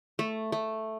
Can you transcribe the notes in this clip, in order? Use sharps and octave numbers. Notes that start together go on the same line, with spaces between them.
A3
A3